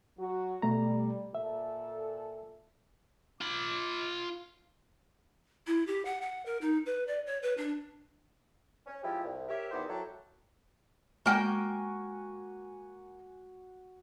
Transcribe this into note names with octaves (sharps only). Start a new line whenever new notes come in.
F#3 F#4
B2 G3 A3 A#5
A#2 A4 E5
F4 B5 D6
E4
G4
F#5
F#5
A#4
D#4
B4
D5
C#5
B4
D4
C#4
F3 G#3 E4 G4
C2
G4 A#4 C#5 E5
E2 D#3 F#3 B3 C5 D6
F#3 E4 G4 A4
G#3 A#3 F#4 G5 G#5